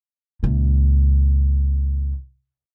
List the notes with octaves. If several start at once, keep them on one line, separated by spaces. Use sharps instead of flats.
C#2 A#2